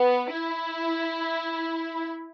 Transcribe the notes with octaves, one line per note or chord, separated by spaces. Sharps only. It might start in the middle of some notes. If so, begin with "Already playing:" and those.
Already playing: B3
E4